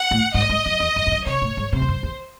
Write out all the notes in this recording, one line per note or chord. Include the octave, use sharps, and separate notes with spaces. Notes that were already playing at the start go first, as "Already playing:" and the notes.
Already playing: F#5
A2
G#2 D#5
G#2
F#2
E2
F#2
E2
F#2
C3 C#5
A2
G#2
C3 C5
E2
F#2
E2